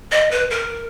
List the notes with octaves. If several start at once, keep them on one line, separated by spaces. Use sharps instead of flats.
D#5
B4
A#4